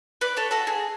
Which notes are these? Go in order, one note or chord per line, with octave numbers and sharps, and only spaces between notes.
B4 D5
A4 C#5
F#4 A4
G#4